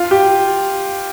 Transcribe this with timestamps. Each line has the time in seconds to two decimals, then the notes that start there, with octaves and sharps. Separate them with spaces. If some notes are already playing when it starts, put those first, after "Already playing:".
Already playing: F4
0.11 G4